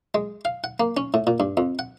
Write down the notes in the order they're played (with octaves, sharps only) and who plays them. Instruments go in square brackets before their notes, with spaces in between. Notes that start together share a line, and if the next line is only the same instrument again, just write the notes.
[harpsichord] G#3
F5
F#5
A#3
C#4
A2
A#2
G2
F2
F#5